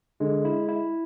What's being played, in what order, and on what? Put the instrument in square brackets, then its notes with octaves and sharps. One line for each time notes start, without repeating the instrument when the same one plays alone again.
[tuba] D3 [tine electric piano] G#3
[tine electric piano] E4
E4